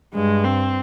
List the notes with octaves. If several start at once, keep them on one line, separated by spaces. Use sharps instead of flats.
G2 G#3
C4